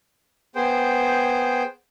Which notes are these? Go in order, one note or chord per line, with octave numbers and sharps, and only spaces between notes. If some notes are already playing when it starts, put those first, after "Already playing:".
B3 G#4 C5 G5